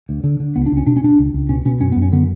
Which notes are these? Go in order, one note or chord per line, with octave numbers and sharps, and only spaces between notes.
D2
D3
D3
C#2 B3
D4
C#2
C#4
B2 D4
C#4
B2 D4
C#2
C#2
B2 C#4
B2 C#4
F#2 C#4
B3
F#2
C#4
D3 B3